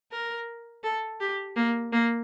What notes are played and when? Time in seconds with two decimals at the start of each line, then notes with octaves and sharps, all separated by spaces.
0.11 A#4
0.83 A4
1.20 G4
1.56 A#3
1.92 A#3